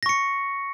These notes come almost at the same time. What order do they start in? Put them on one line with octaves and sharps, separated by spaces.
A#6 C#6 C#7